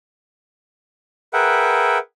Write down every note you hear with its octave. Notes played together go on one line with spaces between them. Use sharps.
G#4 A#4 B4 E5 F#5 G5